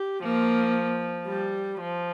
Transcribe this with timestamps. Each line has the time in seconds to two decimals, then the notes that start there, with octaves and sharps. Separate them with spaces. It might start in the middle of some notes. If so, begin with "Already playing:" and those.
Already playing: G4
0.23 F3 A#3
1.27 G3
1.80 F3